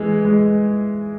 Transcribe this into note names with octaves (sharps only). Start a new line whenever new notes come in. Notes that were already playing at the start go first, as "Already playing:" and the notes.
Already playing: E3 G#3
G#3